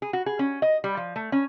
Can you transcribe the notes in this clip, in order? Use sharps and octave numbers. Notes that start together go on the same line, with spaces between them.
G#4
F#4
G#4
C#4
D#5
G3
F3
A3
C#4